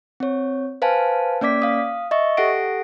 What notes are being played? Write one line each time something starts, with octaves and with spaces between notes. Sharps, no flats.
C4 C#5
B4 C5 F5 G#5 A5
A#3 C#4 D5 D6 B6
F5 D#6
D#5 E5 C#6
G4 A4 F#5 A#6 D7